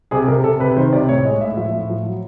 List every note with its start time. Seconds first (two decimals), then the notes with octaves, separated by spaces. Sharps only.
0.11 C3 G#4
0.28 C3 A#4
0.44 C3 A4
0.60 C3 B4
0.77 D#3 C5
0.93 C3 D5
1.09 A2 C#5
1.25 G#3 D#5
1.41 A2 E5
1.57 F3 E5
1.73 A2
1.90 F3
2.06 F#3